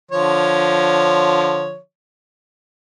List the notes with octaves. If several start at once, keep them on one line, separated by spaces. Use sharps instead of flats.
D3 F3 C#5